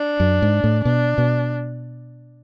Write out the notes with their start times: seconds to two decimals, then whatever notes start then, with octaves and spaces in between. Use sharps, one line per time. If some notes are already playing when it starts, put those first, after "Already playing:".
Already playing: D4
0.20 F#2
0.42 G#2
0.64 A2
0.85 B2 D4
1.18 B2